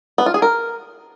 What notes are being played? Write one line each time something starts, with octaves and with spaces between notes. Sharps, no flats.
B3
F4
G#4
A#4